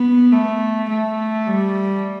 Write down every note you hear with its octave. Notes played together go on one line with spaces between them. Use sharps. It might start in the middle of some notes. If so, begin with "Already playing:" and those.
Already playing: B3
A3
A3
G3